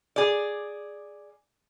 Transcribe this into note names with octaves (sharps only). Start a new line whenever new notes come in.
G#4 D5